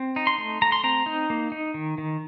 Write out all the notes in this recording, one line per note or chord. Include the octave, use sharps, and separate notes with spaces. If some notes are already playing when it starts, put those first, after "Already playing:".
Already playing: C4
D#4
C6
A3
A3 A#5
C6
C4 A#5
D#4
A#3
D#4
D#3
D#3